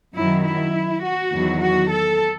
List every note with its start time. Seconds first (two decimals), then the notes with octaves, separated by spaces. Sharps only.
0.15 F#2 D#3 F#3 E4
0.45 E4
1.03 F#4
1.32 E2 D#3 F#3
1.61 F#4
1.91 A4